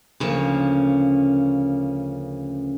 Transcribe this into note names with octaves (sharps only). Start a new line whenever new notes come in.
D2 C#3 F3 A#3 C#4